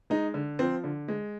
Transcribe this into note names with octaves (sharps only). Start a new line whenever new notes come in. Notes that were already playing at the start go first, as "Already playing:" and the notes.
G#3 D#4
D3
F3 C4
D3
G#3